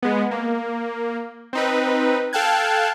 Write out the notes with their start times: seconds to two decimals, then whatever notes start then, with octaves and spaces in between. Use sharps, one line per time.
0.03 G#3 B3
0.31 A#3
1.53 C4 D#4 B4
2.33 A4 F5 G5 A5 F#6 G#6